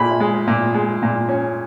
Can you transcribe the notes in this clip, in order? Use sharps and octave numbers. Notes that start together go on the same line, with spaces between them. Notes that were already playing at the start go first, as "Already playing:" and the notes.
Already playing: A#2 B5
G#3
A#2
G#3
A#2
C#4